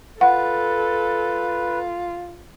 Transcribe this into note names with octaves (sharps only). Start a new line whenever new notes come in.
F4 A4 B4 F#5